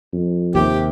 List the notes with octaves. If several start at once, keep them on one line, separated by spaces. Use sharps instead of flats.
F2
D#2 C3 G4